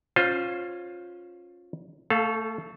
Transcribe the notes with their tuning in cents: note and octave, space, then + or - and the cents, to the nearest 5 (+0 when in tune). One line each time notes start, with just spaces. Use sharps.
C#4 -10 F4 +15 C5 +0
A3 +20 A4 -25 F5 +0